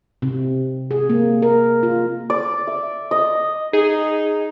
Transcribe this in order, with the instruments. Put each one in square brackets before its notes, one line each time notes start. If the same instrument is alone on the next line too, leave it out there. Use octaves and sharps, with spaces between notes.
[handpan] C3
G#4
A#3
A#4
F4
[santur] D5
E5
D#5
[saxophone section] D#4 [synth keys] G#4